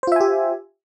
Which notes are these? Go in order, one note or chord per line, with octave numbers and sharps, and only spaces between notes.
F4 G4 C5 E5 G#5